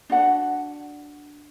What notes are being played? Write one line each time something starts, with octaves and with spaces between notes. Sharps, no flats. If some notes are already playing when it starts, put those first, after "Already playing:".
D4 F#4 F#5 A5